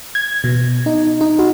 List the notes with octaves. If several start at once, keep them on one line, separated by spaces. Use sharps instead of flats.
G#6
B2
D#4
D#4
F#4